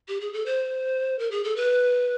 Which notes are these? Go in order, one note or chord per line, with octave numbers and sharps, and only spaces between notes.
G4
G#4
A4
C5
A#4
G#4
A4
B4